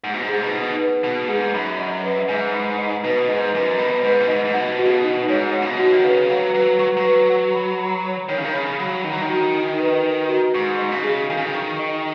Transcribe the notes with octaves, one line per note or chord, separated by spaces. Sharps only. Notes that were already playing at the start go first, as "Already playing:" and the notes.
G#2 F#5
B2
G#2
G#4
B2
D#4
B4
B2 F#5
G#2 G#4
F#2 B5
D#5
B4
G#2 G#5
B5
D#5
B2 B4
G#2 D#5
F#2 B4
B2 B5
G#2 B4
B2
G#2 D#5
G#2
B2 F#5
F#4
C#3
B2
D#4
G#2 C#5
F#5
C#3
B2
F#4
D#3
C#3 B4
F#3 F#5
F#3 B4
F#3 C#6
F#3
B4
F#5
B5
B5
C#5
D#3 C#5
C#3
D#3
C#3 B5
F#3 B5
D#3 D#4
F#3
D#3
F#4
D#4
B4
D#4
F#4
G#2 C#6
D#5
C#3
G#4
D#3 G#5
C#3
D#3
C#6
D#5